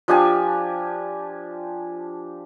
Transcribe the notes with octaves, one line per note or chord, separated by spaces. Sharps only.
F3 D4 G4 G#5